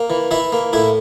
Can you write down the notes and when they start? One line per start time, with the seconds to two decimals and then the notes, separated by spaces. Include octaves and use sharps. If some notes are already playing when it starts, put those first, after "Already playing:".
Already playing: A#3
0.10 E3
0.31 E3 E4 E5
0.52 A#3
0.73 A2 E4 E5